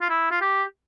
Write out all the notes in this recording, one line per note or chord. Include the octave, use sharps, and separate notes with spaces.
F4
E4
F4
G4